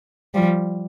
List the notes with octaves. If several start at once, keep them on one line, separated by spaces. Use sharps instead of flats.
F3 G3